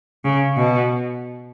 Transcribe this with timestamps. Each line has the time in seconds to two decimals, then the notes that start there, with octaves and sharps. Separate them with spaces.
0.25 C#3
0.57 B2